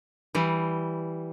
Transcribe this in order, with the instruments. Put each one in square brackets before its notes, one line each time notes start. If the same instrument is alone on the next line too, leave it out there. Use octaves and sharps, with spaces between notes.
[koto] E3 G3